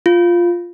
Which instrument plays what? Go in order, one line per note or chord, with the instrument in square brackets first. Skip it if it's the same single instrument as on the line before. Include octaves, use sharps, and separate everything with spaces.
[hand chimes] F4